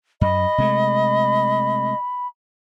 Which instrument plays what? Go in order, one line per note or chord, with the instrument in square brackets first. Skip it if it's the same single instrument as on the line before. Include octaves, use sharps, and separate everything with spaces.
[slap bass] F#2 [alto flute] D#5 [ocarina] B5
[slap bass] C3 G#3 A3